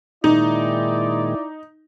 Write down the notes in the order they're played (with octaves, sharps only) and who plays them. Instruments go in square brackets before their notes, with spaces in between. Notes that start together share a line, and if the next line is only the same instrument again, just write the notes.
[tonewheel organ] A#2 D#3 G#3 [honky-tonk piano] D#4 [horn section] E4 D5